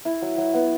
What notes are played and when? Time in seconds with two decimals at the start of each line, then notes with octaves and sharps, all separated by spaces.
0.05 E4
0.22 F#3
0.38 F#3
0.54 B3